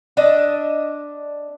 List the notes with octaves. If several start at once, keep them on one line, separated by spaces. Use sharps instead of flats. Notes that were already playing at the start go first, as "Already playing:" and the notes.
D4 D#5 E5